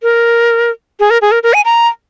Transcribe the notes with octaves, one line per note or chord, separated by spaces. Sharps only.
A#4
G#4
A#4
G#4
A#4
A#4
G#5
A#5